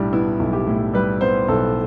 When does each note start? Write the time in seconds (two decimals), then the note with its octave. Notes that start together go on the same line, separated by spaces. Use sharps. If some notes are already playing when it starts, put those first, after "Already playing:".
Already playing: B1 A2 G3 D4 E4
0.13 B3 E4
0.40 B1
0.53 G4
0.67 A2
0.94 G3 B4
1.21 B3 C5
1.48 B1 A4